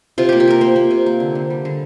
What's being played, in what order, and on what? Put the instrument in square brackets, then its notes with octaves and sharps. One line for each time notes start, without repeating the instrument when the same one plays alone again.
[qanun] C3 F4
A#3 G4
G4
A#3 A#4
A#3 C5
A#3
C3
A#3
D3
D3
G3
D3